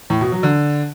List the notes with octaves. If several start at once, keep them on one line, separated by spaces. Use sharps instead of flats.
A2
B2
F#3
D3